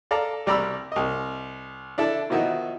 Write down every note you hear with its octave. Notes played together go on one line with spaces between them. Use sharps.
A4 D5 F5 A#5
C2 G3 D5 A#5 B5 E6
C2 D#5
D4 E4 A4
B2 D#3 F3 D#4 E4 F#4